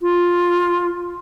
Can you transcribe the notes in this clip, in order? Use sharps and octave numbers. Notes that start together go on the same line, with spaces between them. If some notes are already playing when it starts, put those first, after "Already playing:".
F4